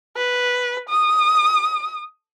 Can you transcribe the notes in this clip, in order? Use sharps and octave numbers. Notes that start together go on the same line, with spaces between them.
B4
D#6